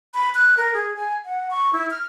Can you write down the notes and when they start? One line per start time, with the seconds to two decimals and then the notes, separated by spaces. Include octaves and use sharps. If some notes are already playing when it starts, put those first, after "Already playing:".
0.14 B5
0.35 F#6
0.57 A#4
0.74 G#4
0.96 G#5
1.25 F#5
1.51 C#6
1.73 E4
1.91 F6